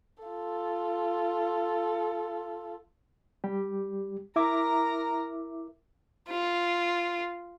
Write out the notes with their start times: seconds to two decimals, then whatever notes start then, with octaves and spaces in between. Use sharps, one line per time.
0.23 F4 A4
3.44 G3 G4
4.36 E4 A#4 E5 A#5 D6
6.29 F4